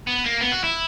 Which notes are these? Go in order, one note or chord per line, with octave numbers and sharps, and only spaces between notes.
B3
A#3
B3
F#4
E4